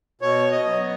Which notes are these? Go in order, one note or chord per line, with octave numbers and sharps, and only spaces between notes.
B2 C#5
D#5
F#3 B3